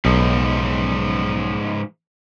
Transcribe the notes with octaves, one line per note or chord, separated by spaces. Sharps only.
B1 G#2 F3